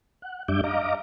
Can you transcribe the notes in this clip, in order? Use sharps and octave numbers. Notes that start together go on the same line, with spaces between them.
F#5
F#2 G3 D4 E5 D6 G6
D#5 F5 A#5 D6